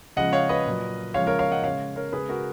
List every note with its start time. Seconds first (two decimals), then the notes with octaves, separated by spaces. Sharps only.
0.16 C#3 F3 G#3 D#5 F#5
0.33 C#5 F5
0.49 B4 D#5
0.66 A#2 F#3
1.14 C#3 F3 G#3 C#5 F5
1.27 A#4 C#5
1.39 C#5 F5
1.52 D#5 F#5
1.64 C#3 G#3 C#5 F5
1.96 A#4 C#5
2.13 C#3 G#3 G#4 B4
2.29 F#4 A#4